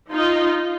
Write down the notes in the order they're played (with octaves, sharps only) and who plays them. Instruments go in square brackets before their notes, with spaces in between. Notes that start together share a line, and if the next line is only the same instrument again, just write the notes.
[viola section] D#4 F4